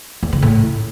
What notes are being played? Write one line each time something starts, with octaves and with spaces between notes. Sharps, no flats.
E2
C#3
A2